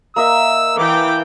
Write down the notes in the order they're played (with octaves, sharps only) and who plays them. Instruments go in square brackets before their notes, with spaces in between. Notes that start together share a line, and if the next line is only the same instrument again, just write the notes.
[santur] A#3 D#5 E5 [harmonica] E6
[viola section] E3 G5 [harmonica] D6